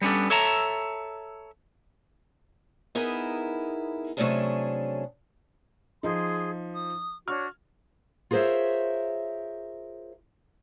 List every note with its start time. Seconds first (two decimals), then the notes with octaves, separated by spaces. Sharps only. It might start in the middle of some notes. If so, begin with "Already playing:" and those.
0.02 G3 B3 C#4 D4 A4
0.30 A4 C#5 E5 A5 A#5
2.95 B3 D#4 E4 G#4 A#4
4.17 C3 F#3 A3 C#4 D4 G#4
6.03 F3 D#4 G#4 C6
6.74 D#6
7.28 D4 F#4 C#5 F6
8.31 F4 G#4 A#4 C5 C#5 E5